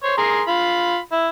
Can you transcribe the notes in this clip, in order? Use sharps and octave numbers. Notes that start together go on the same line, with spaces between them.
C5 C#5
G#4 A#4 C6
F4 B5
E4